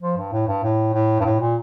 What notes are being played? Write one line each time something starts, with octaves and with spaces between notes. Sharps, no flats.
F3
G2
A2
G2
A2
A2
G2
A2
A#2